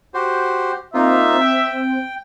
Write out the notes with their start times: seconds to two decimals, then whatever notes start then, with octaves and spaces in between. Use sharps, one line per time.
0.14 F#4 G4 C5
0.94 A#3 C4 D#4 F4 E5
1.41 G5